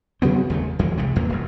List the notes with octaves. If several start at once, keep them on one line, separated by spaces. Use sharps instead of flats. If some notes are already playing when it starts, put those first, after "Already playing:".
C3 F#3 B3 C4
D#2 C#3 A3
F2 E3 G#3
C2 C3 G3 G#3
G1 E2 G2 A#3
F1 F#2